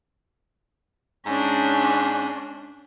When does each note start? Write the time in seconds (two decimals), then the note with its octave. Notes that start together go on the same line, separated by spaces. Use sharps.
1.26 G#2 C#4 D4